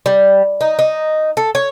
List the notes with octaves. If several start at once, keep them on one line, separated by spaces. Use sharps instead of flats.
G3
D#4
D#4
A4
C#5